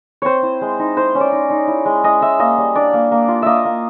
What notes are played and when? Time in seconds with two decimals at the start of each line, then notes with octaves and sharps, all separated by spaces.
0.22 C4 C5 C#5
0.43 E4
0.61 G#3
0.79 D#4
0.97 E4 C5
1.15 C#4
1.20 D5
1.32 D#4
1.50 D#4
1.68 E4
1.85 G#3
2.04 G#3 D#5
2.21 G#3 E5
2.39 A#3 D#5
2.58 G3
2.75 D4 D5
2.93 A#3
3.12 A#3
3.28 F4
3.42 A#3 D#5 E5
3.65 A#3